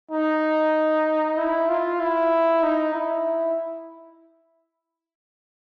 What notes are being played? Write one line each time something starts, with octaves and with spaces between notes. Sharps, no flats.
D#4
E4
F4
E4
D#4
E4